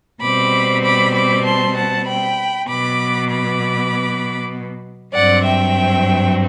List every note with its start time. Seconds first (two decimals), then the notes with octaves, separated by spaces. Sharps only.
0.21 B2 G3 C4 B5 D6
0.83 B5 D6
1.14 B5 D6
1.44 A5 C6
1.75 F#5 A5
2.06 G5 B5
2.68 B2 F#3 B3 B5 D6
3.29 B5 D6
5.14 G2 F#3 C4 D5 F#5
5.45 E5 G5